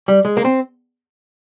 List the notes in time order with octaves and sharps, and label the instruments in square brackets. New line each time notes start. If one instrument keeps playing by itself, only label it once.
[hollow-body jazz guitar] G3
G#3
A#3
C4